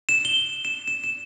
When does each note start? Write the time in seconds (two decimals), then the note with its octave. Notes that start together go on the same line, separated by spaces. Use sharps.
0.09 E7
0.25 G7
0.65 E7
0.88 E7
1.04 E7